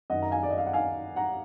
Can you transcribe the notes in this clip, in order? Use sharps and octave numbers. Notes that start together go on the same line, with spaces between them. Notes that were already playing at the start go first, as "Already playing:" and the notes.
F#2 D#3 D#5 F#5
A#5
F5 G#5
D5
D#5
F5
F#5
F5 G#5
F#5 A#5